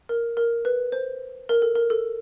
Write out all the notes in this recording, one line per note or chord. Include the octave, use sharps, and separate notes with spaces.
A#4
A#4
B4
C5
A#4
A4
A#4
A4